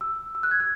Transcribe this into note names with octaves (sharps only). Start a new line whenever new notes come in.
E6
E6
F#6
G#6
F#6